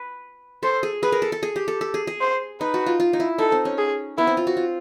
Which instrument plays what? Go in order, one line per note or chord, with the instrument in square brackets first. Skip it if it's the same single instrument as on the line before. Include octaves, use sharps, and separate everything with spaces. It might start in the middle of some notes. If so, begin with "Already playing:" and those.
Already playing: [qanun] B4
[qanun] A4 [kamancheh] C5
[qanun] G#4
[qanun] G#4 [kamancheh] B4
[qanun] A#4
A4
A4
G#4
G4
A4
A4
G#4
G#4
[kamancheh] C5
[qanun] D#4 [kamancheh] B4
[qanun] F#4
F4
F4
D#4
E4
[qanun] D#4 [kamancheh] A4
[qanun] C4
C#4
[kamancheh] G#4
[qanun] B3 [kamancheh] E4
[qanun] C4
F4
F#4
F4